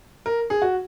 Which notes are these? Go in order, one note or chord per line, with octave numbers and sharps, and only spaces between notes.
A#4
G#4
F#4